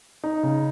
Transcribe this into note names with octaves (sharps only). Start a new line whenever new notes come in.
D#4
C#3